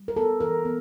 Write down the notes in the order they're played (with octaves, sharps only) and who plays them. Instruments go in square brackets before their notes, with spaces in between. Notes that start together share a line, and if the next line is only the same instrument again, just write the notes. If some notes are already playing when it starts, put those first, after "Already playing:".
Already playing: [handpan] G3
A#4
B3 A4
E3 A#4
B3